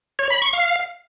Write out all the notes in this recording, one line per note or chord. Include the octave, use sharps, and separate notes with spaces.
C#5
B5
C#6
F5